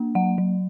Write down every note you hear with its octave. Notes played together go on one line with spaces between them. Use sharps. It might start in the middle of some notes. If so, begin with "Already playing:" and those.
Already playing: A#3 D4
F#3 F#5
F#3